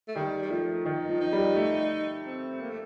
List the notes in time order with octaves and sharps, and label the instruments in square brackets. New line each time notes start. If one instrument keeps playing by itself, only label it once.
[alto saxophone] A3
[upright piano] D#3 [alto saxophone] G3
[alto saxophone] G3
[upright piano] F3 [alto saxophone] A3
[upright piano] D#3 [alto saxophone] D#4
[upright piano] F3
[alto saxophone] D#4
[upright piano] G3
A3
[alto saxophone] C4
A#3
A3